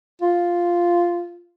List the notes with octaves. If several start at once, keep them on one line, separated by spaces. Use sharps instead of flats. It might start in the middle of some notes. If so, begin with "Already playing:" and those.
F4